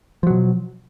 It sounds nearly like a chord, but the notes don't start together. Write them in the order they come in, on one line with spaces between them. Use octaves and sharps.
F3 F#3 B2